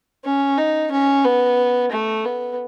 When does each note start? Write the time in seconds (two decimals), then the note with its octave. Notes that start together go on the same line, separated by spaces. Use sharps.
0.25 C#4
0.58 D#4
0.92 C#4
1.25 B3
1.92 A3
2.25 B3